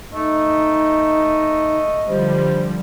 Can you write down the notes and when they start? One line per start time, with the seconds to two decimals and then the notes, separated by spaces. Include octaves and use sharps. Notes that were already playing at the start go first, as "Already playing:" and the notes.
0.13 A3 D#4 D#5
2.08 D3 F3 G3 C5